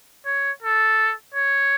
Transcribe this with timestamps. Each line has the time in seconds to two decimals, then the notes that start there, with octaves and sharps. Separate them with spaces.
0.26 C#5
0.63 A4
1.34 C#5